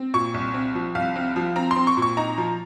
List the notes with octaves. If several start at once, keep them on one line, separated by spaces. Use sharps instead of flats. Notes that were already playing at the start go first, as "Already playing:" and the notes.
Already playing: C4
A#2 C#6
C2
C4
F3
C2 F5
C4
F3
C4 A#5
C6
C4
C#6
A#2
C#6
D#4 A#5
F3